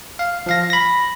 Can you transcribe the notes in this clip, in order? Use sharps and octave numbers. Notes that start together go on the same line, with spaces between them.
F5
F3 F5 A#6
B5 A#6